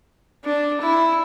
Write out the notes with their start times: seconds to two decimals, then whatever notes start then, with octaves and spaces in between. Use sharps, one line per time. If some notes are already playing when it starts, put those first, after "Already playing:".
0.44 D4
0.81 E4